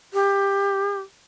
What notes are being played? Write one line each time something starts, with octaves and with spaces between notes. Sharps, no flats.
G4